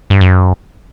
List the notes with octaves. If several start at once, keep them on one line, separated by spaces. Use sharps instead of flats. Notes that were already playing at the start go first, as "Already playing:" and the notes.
G2
F#2